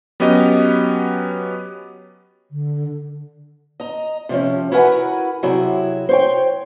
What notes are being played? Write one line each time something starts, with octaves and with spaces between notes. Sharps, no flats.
F#3 B3 C#4 G4 D#5
D3
D#5 A#5
C3 F3 C#4
E4 F#4 A#4 B4 F#5 G#5
C3 F#3 E4 F#4 G#4
C5 C#5 G5